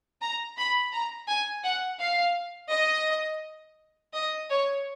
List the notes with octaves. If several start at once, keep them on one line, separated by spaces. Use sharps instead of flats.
A#5
B5
A#5
G#5
F#5
F5
D#5
D#5
C#5